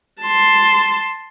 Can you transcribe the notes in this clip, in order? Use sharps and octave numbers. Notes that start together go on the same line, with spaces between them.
A5 C6